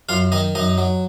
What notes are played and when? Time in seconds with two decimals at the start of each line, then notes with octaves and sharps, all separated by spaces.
0.09 F#2 F4 F5
0.32 D#3 D#4 D#5
0.55 F#2 D#4 D#5
0.78 F#3